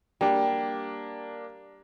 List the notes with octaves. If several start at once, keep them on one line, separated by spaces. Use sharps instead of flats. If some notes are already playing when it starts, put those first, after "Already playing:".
G3 A#3 D4